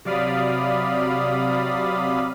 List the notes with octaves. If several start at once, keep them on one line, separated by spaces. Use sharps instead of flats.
C3 F#3 D5 F5 B5 D#6